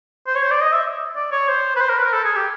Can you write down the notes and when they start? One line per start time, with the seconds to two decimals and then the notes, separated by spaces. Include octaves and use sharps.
0.27 C5
0.35 C#5
0.43 C5
0.51 D5
0.62 D#5
0.72 E5
1.16 D5
1.32 C#5
1.48 C5
1.76 B4
1.81 C5
1.89 A#4
1.98 B4
2.05 A#4
2.13 A4
2.25 G#4
2.35 G4